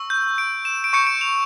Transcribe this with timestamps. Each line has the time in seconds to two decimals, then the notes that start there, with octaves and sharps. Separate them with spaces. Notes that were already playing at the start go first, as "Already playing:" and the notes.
Already playing: C#6 E6
0.10 G6
0.38 D7
0.65 E7
0.84 D7
0.93 C#6 G6 C#7
1.07 D7
1.21 F7